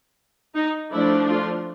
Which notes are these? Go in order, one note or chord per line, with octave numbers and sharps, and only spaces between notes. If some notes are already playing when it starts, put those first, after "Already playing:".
D#4
F3 A3 D4 E4
F4